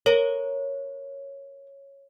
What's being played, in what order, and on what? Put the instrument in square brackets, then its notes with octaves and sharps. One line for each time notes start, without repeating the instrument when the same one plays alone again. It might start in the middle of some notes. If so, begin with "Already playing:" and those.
[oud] A#4 [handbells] C#5